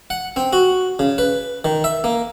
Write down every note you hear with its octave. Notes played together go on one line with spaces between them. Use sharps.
F#5
C4
F#4
C#3
B4
D#3
E5
A#3